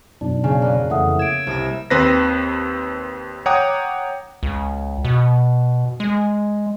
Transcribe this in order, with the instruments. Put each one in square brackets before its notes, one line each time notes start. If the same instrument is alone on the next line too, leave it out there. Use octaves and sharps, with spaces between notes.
[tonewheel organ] F#2 B2 D4 [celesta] D#4
[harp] C#3 [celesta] D5 G#5
[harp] A#3 B3
[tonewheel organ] F2 E3 A3 [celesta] E5 F#5 D#6
[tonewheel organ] E6 [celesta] G#6 D7
[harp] C2 D#6 A#6
[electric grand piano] D#2 C4 B4 C5 A#6
C#5 F#5 G5 A#5 D6 D#6
[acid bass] C#2
B2
G#3